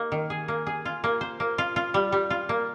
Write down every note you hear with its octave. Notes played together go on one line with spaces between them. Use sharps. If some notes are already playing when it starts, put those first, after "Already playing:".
Already playing: A#3 D#4
D#3
G#4
A#3
G#4
F4
A#3
C5
A#3
F4
F4
G3
G3
F4
A#3